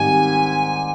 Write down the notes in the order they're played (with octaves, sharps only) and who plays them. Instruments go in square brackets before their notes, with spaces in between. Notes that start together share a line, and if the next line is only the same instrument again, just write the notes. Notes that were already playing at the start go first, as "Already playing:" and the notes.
Already playing: [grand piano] G#2 D#3 G3 C4 G4 [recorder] G#5